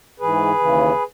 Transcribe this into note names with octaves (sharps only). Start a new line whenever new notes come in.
G#2 E3 G#4 B4
D#2 C#3 E3